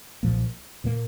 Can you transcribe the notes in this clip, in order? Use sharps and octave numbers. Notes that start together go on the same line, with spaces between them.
B1 A#2 F3 A#3
A#2 F3 A#3